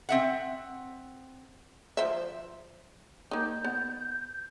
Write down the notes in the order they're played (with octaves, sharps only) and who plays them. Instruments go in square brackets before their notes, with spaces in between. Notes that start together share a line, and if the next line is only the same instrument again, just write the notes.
[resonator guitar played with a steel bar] C4 E5 F#5
[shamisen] F3 C5 E5
[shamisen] A#3 D#4 [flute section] G6
[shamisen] B3